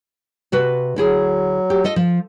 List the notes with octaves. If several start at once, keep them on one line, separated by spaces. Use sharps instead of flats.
C3 F#4 B4
D2 F#3 E4 G#4
G4
F4 A4 D#5
F3